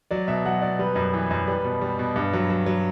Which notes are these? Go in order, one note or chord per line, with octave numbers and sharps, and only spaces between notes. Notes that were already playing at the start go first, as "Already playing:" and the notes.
F#3 D5
B2 E5
F#3 F#5
B2 D5
G3 B4
F#2
E3
F#2
G3 B4
B2
G3
B2
G2
F#3
F#3
F#3